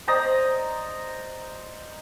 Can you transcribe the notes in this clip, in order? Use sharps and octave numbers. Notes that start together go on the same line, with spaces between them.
C5 D5 D#5 A#5